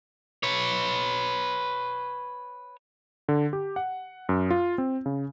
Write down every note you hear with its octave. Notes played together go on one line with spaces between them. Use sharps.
B4 C#5
D3
G4
F#5
F#2
F4
C4
C#3